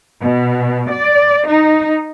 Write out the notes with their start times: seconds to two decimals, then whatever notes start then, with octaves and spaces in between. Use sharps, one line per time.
0.20 B2
0.90 D5
1.47 D#4